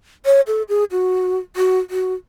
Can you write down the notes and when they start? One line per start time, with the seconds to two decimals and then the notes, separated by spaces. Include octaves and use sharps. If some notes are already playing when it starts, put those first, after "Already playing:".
0.26 C#5
0.47 A4
0.69 G#4
0.91 F#4
1.56 F#4
1.90 F#4